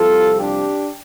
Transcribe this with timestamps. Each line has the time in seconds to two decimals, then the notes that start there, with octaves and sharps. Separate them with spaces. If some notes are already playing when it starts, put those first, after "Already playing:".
Already playing: C2 C3 F3 F4 A4
0.39 D4 G4